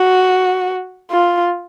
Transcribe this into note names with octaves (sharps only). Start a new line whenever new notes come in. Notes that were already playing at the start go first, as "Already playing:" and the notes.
Already playing: F#4
F4